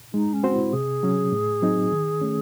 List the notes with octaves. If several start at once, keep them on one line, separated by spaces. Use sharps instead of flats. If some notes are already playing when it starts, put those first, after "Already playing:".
G#3 D#4
C#4
C4 F#4 C5
E4
C3 G#4
F#3 C#4
A2
F#3 C4 D#4
D#3
A3 C#4